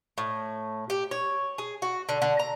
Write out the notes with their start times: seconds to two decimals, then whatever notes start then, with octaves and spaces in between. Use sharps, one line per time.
0.18 A2
0.90 G4
1.11 C#5
1.58 G#4
1.82 F#4
2.09 D3
2.22 D3
2.39 A#5